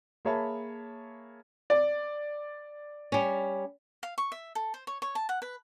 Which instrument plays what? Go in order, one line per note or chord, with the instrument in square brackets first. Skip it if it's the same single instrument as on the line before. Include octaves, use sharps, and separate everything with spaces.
[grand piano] A#3 G#4 C#5 E5 A5 B5
D5
[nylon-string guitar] G3 C#4
[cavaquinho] F5
C#6
E5
A4
C5
C#5
C#5
A5
F#5
B4